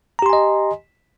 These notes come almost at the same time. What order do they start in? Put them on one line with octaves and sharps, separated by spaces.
A#5 G4 C6 G#5 D#5